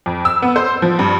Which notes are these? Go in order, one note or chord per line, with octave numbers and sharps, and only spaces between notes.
F2
E6
B3
C5
F3
G2